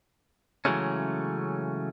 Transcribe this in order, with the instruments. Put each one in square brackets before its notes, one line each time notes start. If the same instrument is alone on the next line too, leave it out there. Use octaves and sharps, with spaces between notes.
[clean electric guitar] C#3 E3 F#3 G#3 A3 C#4